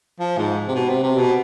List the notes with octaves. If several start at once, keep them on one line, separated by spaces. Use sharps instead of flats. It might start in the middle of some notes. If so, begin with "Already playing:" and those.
F3
G#2
C3
B2
C3
C3
B2